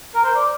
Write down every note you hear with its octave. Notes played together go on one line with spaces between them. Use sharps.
A#4
C5
D5